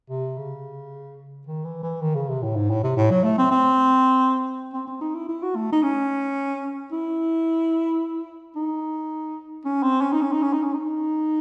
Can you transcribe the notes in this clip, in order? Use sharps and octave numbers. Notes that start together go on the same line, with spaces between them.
C3
C#3
D#3
E3
E3
D#3
C#3
C3
A2
G#2
A2
C3
A2
F#3
A3
C4
C4
C4
C4
D#4
E4
E4
F#4
A3
D#4
C#4
E4
D#4
C#4
C4
C#4
D#4
C#4
D#4
C#4
D#4
C#4
D#4